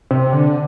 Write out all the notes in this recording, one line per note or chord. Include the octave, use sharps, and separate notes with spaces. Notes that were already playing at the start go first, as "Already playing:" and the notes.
C3
D3